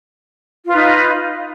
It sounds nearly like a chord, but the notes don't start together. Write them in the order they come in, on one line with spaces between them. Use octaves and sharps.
F4 B4 D#4